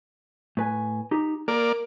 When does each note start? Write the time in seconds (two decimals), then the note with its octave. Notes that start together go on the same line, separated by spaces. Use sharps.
0.57 A2 B4 G#5
1.11 D#4 G4
1.48 A#3 A#4 D5